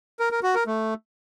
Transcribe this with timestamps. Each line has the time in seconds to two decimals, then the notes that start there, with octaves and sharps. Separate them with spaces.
0.20 A#4
0.31 A#4
0.43 F#4
0.55 A#4
0.67 A3